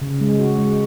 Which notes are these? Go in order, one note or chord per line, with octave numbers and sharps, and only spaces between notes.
C#3
G#3
F#4
G#3